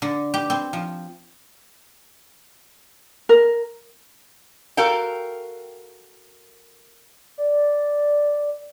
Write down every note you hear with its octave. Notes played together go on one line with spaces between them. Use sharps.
D3
G4
C4
F3
A#4
F#4 A4 A#4 F5 G5
D5